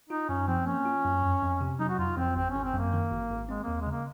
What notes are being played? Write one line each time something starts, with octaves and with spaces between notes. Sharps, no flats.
D#4 F4
F#2 C#4
F3 C4
A#3 C#4
F4
F#2
F2
F2
C3
F#3 D#4
F#4
F2 F4
F2 C4
G#1 C4
G#1 C#4
C4
F#2 A#3
D#3
G#1
G#1
G#3 C4
D#2 A#3
G#3
C#3 A#3